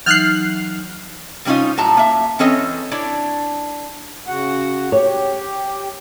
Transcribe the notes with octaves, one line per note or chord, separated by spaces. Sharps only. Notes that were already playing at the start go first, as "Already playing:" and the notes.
E3 F#3 D#4 F6 F#6 C7
C3 G3 C#4 D#4 F4
A2 F#3 A5 A#5
A#3 E5
E3 C4 C#4 A4 C#5 D#5
D4 E4 C#5 D5
C#3 F#4 F#5
G4 C#5